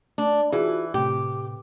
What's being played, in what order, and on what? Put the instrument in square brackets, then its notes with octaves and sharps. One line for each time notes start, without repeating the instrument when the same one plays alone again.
[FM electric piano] A3 [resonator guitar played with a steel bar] D4
[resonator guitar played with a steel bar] E3 [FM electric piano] F4 F#4 G#4
[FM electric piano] A2 C3 [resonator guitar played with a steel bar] G4